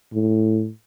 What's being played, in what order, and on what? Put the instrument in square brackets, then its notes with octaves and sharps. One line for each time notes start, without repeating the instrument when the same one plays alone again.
[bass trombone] A2